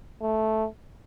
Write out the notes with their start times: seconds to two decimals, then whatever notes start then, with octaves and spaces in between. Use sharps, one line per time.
0.22 A3